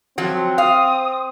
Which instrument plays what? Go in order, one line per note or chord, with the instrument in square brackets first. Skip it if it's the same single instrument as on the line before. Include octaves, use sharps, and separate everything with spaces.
[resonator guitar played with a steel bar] F3 F#3 F#4 [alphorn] C4
[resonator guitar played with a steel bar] F5 [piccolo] D#6